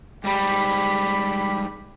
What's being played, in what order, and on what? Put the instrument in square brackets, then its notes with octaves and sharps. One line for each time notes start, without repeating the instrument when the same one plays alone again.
[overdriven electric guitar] G#2 G3 [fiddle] G4 B5